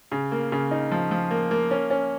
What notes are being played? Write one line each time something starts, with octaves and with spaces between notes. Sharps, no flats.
C#3
A#3
C#3
D#4
F3
F3
A#3
A#3
C#4
C#4